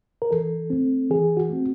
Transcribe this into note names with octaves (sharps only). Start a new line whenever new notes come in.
A#4
E3 A4
A3 C4
E3 G#4
F#4
A3 C4